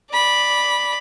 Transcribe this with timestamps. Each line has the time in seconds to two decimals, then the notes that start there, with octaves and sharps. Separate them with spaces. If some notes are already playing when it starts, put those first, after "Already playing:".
0.11 D5 B5